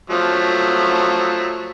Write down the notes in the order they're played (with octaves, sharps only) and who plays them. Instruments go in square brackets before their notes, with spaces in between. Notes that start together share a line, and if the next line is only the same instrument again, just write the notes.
[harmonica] F3 F#3 A3